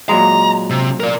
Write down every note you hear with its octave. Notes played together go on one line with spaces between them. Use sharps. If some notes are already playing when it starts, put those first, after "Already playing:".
A#2 F#3 G#3 A#5
C3
A#4 D5